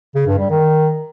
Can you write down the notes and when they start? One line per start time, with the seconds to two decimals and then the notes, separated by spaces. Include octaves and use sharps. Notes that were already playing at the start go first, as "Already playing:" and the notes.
0.15 C#3
0.27 G2
0.39 G3
0.50 D#3